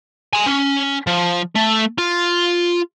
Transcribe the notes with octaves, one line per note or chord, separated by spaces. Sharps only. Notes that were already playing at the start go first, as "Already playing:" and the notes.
G#5 C6
C#4
F3
A3
F4